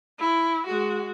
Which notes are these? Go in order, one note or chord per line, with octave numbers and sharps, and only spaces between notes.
E4
G#3 F#4